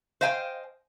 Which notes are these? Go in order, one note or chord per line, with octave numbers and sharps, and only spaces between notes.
C5 D#5 F5 G5 G#5